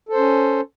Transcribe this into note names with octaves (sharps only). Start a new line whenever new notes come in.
C#4 A4 C5